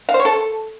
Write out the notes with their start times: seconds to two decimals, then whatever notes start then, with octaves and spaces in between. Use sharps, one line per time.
0.09 F5
0.14 C5
0.20 C#5
0.25 A4